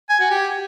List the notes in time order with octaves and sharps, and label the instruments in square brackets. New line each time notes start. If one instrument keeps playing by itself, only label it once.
[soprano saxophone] G#5
F#4
G4